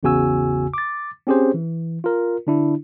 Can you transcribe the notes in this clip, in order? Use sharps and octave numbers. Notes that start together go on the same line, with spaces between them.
A1 E2 C#3 F#4 G#5 E6
D6 A6
C4 C#4 G4 G#4 C5
E3
F4 A#4
D3 D4 E4